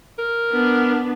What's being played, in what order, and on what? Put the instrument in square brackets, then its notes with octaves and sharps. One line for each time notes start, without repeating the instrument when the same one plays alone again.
[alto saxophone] A#4
[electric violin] B3 D4